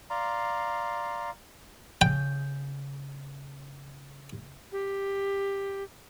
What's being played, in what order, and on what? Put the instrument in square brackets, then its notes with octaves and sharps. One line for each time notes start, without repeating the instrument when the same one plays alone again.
[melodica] D5 F5 A#5 C6
[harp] C#3 G6 [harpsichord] G5
[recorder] G4